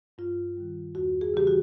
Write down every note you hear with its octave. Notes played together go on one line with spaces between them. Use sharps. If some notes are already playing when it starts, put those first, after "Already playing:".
G2 F4
D#3 G3
E2 F#4
G#4
C#3 E3 G3 G4
F#4